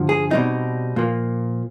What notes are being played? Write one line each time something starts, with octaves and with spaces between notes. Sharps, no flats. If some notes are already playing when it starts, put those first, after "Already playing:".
Already playing: G2 D3 F3
G#4
B2 G3 C4 D#4
A#2 F3 A#3